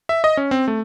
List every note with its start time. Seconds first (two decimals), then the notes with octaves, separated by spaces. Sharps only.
0.09 E5
0.24 D#5
0.37 C#4
0.51 C4
0.68 A3